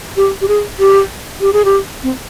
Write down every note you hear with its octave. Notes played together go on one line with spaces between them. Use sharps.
G4
G4
G#4
G4
G4
G#4
G4
C4